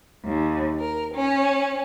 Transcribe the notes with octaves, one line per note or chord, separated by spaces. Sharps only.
D#2
A#4
C#4